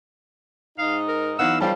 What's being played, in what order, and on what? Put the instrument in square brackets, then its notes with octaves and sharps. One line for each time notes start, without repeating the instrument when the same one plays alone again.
[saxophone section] G#2 D#4 [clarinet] F5
[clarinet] A#4
[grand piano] E3 B3 D#4 [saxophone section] F#3 F5 F#5 [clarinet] E6
[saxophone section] F#2 C#3 F3 [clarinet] G3 [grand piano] F5 G5 A5